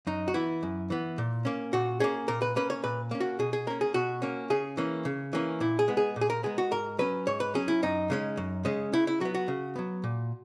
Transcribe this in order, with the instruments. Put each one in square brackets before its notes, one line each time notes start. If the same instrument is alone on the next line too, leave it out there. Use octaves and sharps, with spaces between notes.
[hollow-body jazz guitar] F#2 D#4
F#4
E3 B3 E4
F#2
E3 B3
A#2
A#3 C#4
A#2 F#4
A#3 C#4 G#4
A#2 A#4
B4
A#3 C#4 B4
C#5
A#2 B4
A#3 C#4
F#4
B2 G#4
G#4
A#3 C#4 A#4
G#4
B2 F#4
A#3 C#4
C#3 G#4
E3 A#3 C#4
C#3
E3 A#3 C#4
A#2 E4
G#4
G#3 B3
G#4
A#2
G#4
A#4
G#3 B3 G#4
F#4
G#2 A#4
F#3 C#4 B4
G#2 C#5
B4
F#3 C#4 G#4
E4
F#2 D#4
C#3 G#3 C#4
F#2
C#3 G#3 C#4
C#3 E4
E4
F#3 B3 F#4
F#4
C#3
F#3 B3
A#2